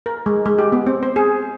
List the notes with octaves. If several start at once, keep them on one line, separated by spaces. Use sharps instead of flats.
A#4
G#3
G#3
G4
B3
C4
C5
G#4